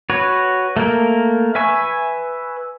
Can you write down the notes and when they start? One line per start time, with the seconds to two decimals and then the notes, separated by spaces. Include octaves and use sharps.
0.10 F#4 B4 C#5
0.77 A3 A#3 A#4
1.55 B4 E5 G#5 C#6